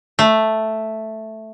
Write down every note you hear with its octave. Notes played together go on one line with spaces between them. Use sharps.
A3